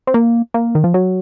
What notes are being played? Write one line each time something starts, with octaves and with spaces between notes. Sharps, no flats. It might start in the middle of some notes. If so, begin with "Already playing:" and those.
C4
A#3
A#3
D#3
F3
F#3